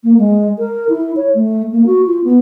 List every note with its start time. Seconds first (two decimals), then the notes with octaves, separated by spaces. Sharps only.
0.04 A#3
0.18 G#3
0.58 A#4
0.89 E4
1.16 C#5
1.35 A3
1.72 A#3
1.86 F#4
2.06 F4
2.24 B3